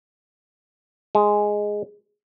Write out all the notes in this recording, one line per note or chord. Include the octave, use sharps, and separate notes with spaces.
G#3